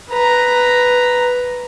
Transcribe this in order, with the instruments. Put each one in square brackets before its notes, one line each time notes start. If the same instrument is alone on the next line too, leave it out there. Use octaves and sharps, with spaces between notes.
[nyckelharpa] B4 A#5